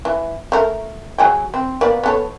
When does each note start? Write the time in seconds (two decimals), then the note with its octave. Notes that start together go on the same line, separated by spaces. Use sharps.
0.05 E3
0.52 A3 A#4
1.18 F#3 G#4 G5
1.54 C4
1.81 A#3 B3 D5
2.03 B3 A4 C#5